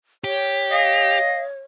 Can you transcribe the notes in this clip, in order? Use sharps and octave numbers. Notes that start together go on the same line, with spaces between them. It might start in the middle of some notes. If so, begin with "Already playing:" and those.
G4 C#5
D#5 F5